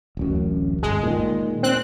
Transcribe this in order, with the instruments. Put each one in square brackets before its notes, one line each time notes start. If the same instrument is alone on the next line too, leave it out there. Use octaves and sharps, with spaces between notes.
[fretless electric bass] D1 A1 F#2
[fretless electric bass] G1 [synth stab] G#3
[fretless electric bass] A#2 D#3
[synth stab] C4 F#6